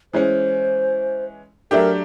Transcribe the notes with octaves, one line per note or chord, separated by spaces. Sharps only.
E3 G#3 C#4 C5
F#3 A3 D4 G4 A#4